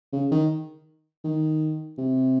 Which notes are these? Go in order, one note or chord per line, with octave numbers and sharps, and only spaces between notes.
C#3
D#3
D#3
C3